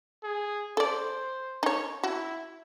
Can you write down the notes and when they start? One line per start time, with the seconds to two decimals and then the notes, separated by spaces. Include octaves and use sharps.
0.23 G#4
0.77 A4 C5 D5
1.63 D#4 C#5
2.03 E4 F#4